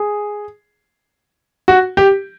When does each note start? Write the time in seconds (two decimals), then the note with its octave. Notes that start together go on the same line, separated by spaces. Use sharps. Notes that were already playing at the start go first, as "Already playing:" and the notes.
Already playing: G#4
1.68 F#4
1.97 G4